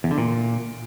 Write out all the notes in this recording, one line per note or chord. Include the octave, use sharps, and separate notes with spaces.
E2
D3
A#2